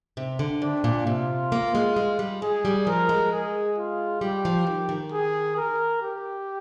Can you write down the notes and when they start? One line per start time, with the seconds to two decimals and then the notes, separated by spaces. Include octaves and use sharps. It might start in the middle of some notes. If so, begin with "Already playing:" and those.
0.17 C3
0.39 D3
0.62 C3 D4
0.84 A#2
1.07 C3 F4
1.52 A#3
1.75 G#3
1.96 G#3
2.19 G3
2.42 G#3 G#4
2.65 G3
2.87 F3 A#4
3.09 G#3
3.32 G#4
3.78 F4
4.21 G3 G4
4.45 F3
4.67 D#3
4.89 D#3
5.12 G#4
5.57 A#4
6.02 G4